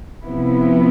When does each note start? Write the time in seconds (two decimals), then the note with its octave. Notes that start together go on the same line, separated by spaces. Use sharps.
0.25 C3 F3 B3 E4